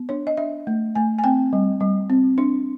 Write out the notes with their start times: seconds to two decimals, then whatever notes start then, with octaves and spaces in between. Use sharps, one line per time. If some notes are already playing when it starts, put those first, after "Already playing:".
Already playing: B3
0.09 D4 C#5
0.27 D#5
0.37 D4 E5
0.67 A3
0.95 A3 G#5
1.18 G#5
1.24 C4 G5
1.53 G3
1.81 G3
2.10 C4
2.38 D4